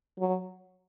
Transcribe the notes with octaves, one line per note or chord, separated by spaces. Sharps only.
F#3